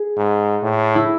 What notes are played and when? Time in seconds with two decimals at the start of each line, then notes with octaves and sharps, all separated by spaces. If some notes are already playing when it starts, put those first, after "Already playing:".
Already playing: G#4
0.17 G#2
0.63 A2
0.95 E4